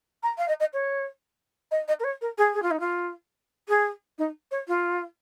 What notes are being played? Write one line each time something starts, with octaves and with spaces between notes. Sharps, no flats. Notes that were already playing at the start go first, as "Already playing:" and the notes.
A#5
F5
D#5
D#5
C#5
D#5
D#5
A#4
C#5
A#4
G#4
G#4
F4
D#4
F4
G#4
D#4
C#5
F4